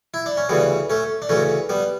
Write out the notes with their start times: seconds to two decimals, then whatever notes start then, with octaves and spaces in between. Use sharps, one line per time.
0.14 E4
0.26 D4
0.37 C#4
0.49 D2 C#3 E3 G3 B3
0.90 A3 C#4
1.22 D4
1.29 D2 C#3 E3 A3 C#4
1.69 G3 B3